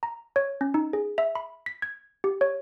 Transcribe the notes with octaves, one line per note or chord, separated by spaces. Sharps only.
A#5
C#5
C#4
D#4
G#4
E5
B5
B6
G#6
G4
C#5